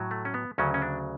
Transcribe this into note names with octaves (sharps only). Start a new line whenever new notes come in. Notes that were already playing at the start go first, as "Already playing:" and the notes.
Already playing: A2 F#3
A3
C#4
B3
D2 C#3 F#3 C#4
C#4
D4